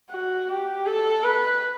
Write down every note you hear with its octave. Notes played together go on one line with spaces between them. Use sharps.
F#4
G4
A4
B4